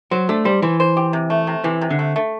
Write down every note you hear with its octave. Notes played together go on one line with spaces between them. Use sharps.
F#3 C5
A3 D4
G3 C5
E3 C5
C5
G4
C3
A3
C3
C3 E3
C3
D3
A3
A3